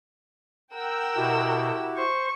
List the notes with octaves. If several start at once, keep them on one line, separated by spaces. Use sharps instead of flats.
A#4 F#5 G5 E6
B2 E4 F#4 G4
C5 C#6